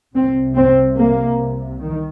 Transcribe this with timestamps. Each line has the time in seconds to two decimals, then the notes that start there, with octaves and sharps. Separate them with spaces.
0.14 C2 C3 C4
0.56 C4
0.98 A#3
1.81 D#3